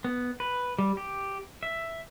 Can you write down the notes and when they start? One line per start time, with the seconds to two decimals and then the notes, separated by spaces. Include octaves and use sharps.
0.04 B3
0.40 B4
0.79 G3
0.97 G4
1.63 E5